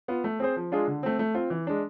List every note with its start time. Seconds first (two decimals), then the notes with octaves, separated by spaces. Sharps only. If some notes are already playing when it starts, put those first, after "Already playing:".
0.08 B3 F4
0.24 A3
0.40 C4 G#4 C5
0.56 F3
0.72 G#3 D4 F4 G#4
0.88 D3
1.03 A3 C4
1.19 A3
1.35 C4 F4
1.50 E3
1.67 G#3 D4